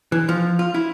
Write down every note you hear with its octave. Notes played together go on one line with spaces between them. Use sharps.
E3
F3
F4
E4